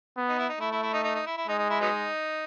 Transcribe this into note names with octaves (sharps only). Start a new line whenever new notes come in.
B3
D#4
E4
D#4
A3 E4
E4
E4
D#4
D#4
D#4
E4
E4
G#3 D#4
D#4
E4
F#3 B3 D#4